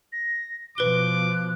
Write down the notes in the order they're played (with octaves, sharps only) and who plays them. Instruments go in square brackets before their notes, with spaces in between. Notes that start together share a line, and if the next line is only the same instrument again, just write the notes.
[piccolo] A#6
[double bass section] B2 F3 [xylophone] B4 G7 [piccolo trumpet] D6 [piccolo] F#6